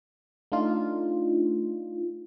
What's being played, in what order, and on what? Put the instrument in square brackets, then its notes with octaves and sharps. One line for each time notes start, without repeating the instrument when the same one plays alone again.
[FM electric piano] A3 D4 D#4 F4